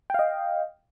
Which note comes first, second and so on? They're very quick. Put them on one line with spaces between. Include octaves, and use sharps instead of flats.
G5 F5 D#5